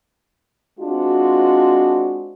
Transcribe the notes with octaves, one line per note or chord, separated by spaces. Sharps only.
G#3 C4 D4 F4 F#4